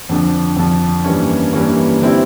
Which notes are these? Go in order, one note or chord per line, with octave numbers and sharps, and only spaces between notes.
F2 D3 F3
F2 D3 F3
G2 E3 G3 A#3 C#4
G2 E3 G3 A#3 C#4
D3 G3 C4 E4